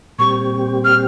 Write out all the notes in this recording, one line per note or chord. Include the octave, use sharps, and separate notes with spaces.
A#2 G3 C4 G4 C#6
F6